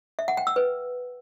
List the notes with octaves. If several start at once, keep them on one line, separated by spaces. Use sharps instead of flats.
E5
F#5
G5
E6
B4